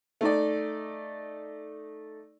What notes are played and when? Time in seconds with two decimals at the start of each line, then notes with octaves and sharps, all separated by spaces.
0.21 A3 D#4 D5